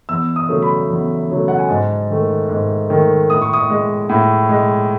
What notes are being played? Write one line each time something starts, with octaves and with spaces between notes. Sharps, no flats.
E2 E6
D#6
C#3 F#3 A3
B5
E2
C#3 F#3 A3
F#5
G#5
G#2 A5
D#3 A3
G#2
D#3 A3
A2 D#6
C#6
D#6
G#3
A2
G#3